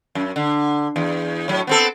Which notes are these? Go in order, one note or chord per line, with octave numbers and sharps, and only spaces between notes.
F#2
D3
E2
A2 F#3
B3 C4 A4